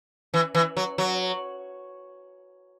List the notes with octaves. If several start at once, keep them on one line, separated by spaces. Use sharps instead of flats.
E3
E3
F#3
F#3